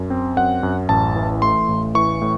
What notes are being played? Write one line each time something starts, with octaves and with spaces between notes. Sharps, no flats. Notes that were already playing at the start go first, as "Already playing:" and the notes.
Already playing: F#2
C4
F#2 F#5
F#2
A1 A5
E3
A3 C6
A1
E3 C#6
A2